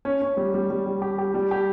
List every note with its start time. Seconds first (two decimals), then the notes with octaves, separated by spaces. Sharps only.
0.05 C#4
0.22 C#4
0.37 G3
0.54 G3
0.70 G3
0.86 G3
1.02 G4
1.19 G4
1.34 G3
1.51 G4